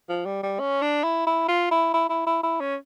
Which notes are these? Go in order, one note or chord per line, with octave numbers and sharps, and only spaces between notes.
F3
G3
G3
C#4
D4
E4
E4
F4
E4
E4
E4
E4
E4
C#4